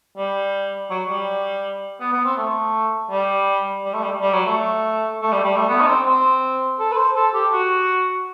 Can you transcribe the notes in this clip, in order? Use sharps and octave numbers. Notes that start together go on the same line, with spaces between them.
G3
F#3
G3
B3
B3
C4
A3
G3
G3
A3
G3
G3
F#3
A3
A3
G3
G3
A3
B3
D#4
C4
C4
A4
B4
C5
A4
G4
F#4